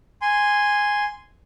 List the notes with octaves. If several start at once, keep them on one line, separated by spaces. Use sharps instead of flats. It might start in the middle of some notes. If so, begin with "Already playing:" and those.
G#5 C6